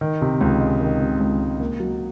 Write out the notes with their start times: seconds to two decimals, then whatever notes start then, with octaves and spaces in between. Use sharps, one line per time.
0.01 D#3
0.22 C3
0.41 C#2
0.61 G#3
0.81 D#3
1.01 C3
1.20 C#2
1.40 G#3
1.60 A#3
1.80 F#3